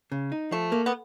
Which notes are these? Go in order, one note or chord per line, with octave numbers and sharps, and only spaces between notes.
C#3
D#4
F3 A3
A#3
B3